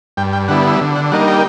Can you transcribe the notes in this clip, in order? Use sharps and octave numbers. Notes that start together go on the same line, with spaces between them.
G2 G5
G5
D3 G3 B3 E4 F#5
D3
F#5
G3 A#3 D#4 F#5
G5